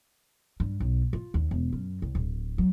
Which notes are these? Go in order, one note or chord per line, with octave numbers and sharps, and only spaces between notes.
G2
B1
F4
D#2
E1
F#2
C2
D1
F#3